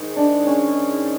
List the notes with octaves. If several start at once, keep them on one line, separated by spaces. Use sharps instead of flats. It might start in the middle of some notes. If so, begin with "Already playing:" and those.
Already playing: G#2 D#3 G#3
D4
C#4